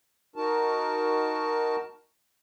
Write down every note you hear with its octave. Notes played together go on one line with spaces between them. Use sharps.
D#4 F#4 A#4 A5